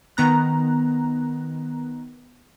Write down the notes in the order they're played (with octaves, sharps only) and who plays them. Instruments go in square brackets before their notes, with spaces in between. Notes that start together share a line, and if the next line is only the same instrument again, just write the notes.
[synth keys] D#3 B3 A#5 F#6